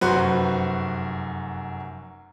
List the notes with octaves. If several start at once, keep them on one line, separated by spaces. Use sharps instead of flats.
F1 F#2 F#4 B4 C5 C#6